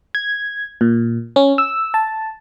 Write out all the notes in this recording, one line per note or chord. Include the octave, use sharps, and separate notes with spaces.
G#6
A#2
C#4
E6
A5